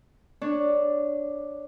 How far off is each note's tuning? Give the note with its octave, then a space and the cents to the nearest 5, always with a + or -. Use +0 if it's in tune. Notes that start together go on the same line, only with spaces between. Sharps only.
D4 +0 C#5 +0